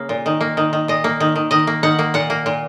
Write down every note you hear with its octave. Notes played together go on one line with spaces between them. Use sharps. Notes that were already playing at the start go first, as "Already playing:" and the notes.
Already playing: C#3 A#3
A#2
D#3
A#3
D#3
D#3
A#2 D#5
A#3
D#3
D#3
D#3 D#5
A#3
D#3 F#5
A#3
A#2 F#5
A#3
A#2